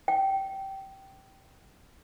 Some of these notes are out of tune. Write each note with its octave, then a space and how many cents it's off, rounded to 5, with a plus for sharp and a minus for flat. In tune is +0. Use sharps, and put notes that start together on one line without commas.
G5 -15